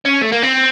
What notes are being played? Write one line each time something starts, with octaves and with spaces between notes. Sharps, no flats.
C#4
A3
A#3
C4